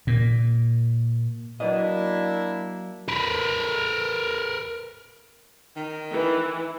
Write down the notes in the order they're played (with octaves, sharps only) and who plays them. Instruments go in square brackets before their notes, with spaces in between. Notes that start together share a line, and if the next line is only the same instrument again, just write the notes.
[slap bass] A#2
[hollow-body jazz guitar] F#3 B4 D#5 [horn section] A#3 D4 E4
[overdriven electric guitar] A#4 B4
[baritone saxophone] D#3
[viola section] E3